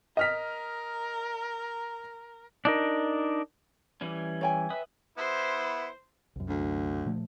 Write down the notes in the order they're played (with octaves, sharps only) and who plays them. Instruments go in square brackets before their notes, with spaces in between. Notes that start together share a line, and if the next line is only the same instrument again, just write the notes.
[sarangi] A#4 [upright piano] D#5 F6 B6
[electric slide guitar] D4 D#4 A#4
[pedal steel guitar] E3 G3 C#4
[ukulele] C#5 G5 G#5
[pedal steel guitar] B4 E5 D#6
[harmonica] B3 E4 [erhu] C5
[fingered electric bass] C2 F#2
[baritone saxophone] D2
[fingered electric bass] A#2 F3 A3